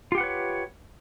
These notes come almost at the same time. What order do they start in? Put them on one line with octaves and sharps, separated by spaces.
F4 G4 F#5 B4 C#5